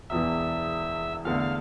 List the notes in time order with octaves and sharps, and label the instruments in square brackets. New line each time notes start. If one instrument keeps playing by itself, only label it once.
[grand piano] E1 E2 E3 [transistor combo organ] E5
[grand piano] E2 D3 A3 [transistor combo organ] F5
[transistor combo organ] F5